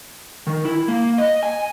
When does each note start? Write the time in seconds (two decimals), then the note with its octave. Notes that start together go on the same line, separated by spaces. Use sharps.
0.47 D#3
0.65 E4
0.88 A#3
1.18 D#5
1.43 G#5